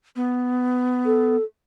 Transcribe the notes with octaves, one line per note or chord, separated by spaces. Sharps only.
B3
A4